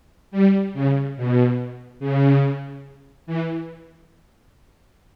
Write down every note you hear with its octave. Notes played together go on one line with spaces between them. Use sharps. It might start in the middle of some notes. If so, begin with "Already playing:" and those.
G3
C#3
B2
C#3
E3